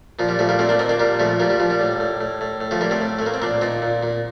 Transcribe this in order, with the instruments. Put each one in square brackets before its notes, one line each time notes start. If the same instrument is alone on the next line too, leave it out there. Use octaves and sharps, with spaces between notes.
[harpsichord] A#2 F3
G3
A#2 F3 A3
G3 A#3
A#2 A3 C4
A#3 D4
A#2 C4 D#4
A#3 D4
A#2 G3 A#3
A#2 F3 A3
A#2 G3 A#3
G3
A#2 F3
G3
A2
A2
A2
A2
A2
F3 A3
A2 G3 A#3
A3 C4
A2
A3
A2 A#3
C4
A#2 A#3 D4
A#2 C4 D#4
A#2
A#2